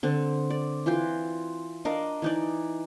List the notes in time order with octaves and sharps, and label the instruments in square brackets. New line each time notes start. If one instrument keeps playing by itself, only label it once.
[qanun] D3 C4
D5
E3 F4 G5 C6
D4 A#4 D#5 F5
E3 D#4 D5